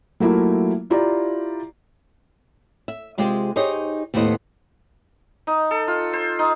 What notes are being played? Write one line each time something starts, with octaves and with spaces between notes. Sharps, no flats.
F#3 A3 A#3 E4 F4
E4 F4 G4 D5 A#5
E5
C3 G#3 F4 G4 G#4 C5
D#4 G4 G#4 C5 C#5 D#5
D#2 A2 B3 G4 C5 D#5
D#4
A4
F4
C5
D#4